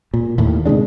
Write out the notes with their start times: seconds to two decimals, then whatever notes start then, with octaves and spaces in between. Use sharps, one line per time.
0.14 A#2
0.38 D#2 A2
0.65 C3 D#3 G#3 D4